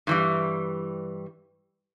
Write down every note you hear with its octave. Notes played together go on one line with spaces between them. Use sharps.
G2 E3 G3